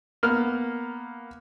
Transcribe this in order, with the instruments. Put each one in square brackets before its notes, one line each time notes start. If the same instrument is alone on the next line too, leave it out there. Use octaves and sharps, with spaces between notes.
[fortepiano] A#3 B3 F6